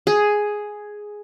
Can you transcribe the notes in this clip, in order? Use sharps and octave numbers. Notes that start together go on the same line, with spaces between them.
G#4